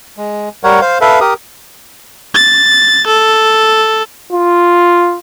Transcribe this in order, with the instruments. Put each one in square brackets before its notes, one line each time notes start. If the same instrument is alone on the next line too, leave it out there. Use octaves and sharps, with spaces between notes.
[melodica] G#3
G3 A#4 C#5 F#5
C5 F5
A4 B4 E5 F5
G4 A#4 D#6
[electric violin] A6
A4
[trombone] F4